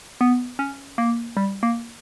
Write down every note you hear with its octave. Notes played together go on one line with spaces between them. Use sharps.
B3
C#4
A#3
G3
A#3